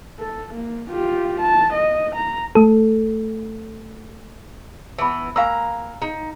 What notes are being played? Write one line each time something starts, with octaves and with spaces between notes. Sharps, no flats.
A4
A#3
F4 G4
A5
D#5
A#5
A3 A4
E3 B3 A5 B5
A#3 F5 G#5 A#5 E6
D#4